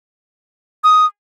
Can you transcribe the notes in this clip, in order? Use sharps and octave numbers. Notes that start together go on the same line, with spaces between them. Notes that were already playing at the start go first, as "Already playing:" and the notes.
D#6